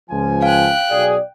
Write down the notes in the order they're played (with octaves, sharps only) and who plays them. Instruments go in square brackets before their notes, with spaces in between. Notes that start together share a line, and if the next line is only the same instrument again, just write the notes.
[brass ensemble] C#2 F3 G#5
[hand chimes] F5 [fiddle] G5 F#6
[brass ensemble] B1 G#4 [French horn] D5